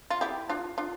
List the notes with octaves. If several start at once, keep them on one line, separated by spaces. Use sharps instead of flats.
F4
E4 G4
D4 F4
D4 F4